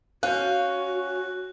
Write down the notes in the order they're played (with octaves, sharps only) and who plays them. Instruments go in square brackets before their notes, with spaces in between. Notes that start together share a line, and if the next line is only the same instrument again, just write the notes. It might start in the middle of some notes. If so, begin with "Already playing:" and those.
[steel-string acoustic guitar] C#4 [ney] F#4 [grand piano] F5 G6 [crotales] F#6